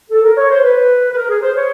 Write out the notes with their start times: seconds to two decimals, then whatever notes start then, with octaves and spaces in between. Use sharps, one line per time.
0.11 A4
0.24 A#4
0.38 C#5
0.50 C5
0.63 B4
1.12 B4
1.16 A#4
1.30 G#4
1.42 C5
1.56 C#5